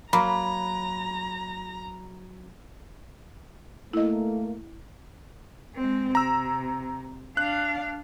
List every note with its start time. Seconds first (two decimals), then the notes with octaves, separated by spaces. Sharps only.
0.13 F#3 A#3 A#5 B5
3.93 A3 A#3 E4 D#5
5.76 G#3 C4
6.15 C3 A#5 E6
7.37 D4 F5 F#6